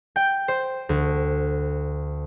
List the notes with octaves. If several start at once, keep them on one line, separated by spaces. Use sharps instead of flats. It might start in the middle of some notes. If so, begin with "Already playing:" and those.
G5
C5
D2